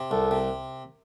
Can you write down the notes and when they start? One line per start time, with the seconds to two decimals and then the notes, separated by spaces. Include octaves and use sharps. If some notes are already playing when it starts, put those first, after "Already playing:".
Already playing: C3
0.11 C2 A4
0.31 C3